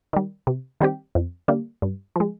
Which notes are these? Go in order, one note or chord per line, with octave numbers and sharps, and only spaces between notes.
D#3 G3
C3
D#3 G3 C4 G4
F2
D3 G3 A#3
G2
F3 G#3